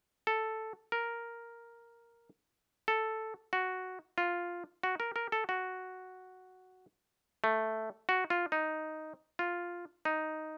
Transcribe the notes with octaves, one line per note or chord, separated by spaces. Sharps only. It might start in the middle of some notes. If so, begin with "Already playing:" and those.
A4
A#4
A4
F#4
F4
F#4
A#4
A#4
A4
F#4
A3
F#4
F4
D#4
F4
D#4